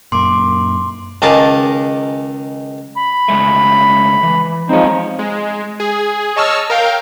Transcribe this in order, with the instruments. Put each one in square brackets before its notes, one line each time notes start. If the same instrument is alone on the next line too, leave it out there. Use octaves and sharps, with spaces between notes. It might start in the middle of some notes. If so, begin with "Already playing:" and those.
[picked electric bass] F#2 A#2 [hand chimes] C6 D6
[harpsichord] C#2 D#3 G#4 A#4 A5 D6
[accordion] B5
[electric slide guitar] C#3 G#3 A3
E3
[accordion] F3 G#3 D#4 [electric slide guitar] C4 C#5
[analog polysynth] G#3
G#4
C#5 D#5 A5 C#6 E6 F6
A#4 F5 G5